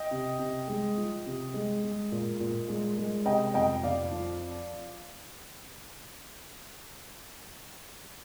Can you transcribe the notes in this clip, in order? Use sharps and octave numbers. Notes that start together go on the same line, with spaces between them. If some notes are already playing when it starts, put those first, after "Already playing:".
Already playing: D#5 G5
C3
C3
G#3
F3
C3
G#3
G#3
A#2
A#2
G#3
G#3
C3 D#5 G5
F2 D#5 G5
F2 D5 F5
F3